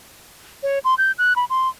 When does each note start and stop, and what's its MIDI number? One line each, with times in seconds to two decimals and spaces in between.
0.63 0.79 73
0.84 0.95 84
0.98 1.12 91
1.18 1.33 90
1.36 1.45 83
1.50 1.69 84